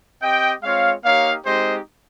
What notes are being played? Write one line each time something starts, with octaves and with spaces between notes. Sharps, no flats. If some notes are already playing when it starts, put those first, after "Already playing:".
C4 G4 D#5 G5
G#3 C4 F4 C#5 F5
A#3 D#4 G4 C#5 F5
G#3 C4 D#4 G4 C5 D#5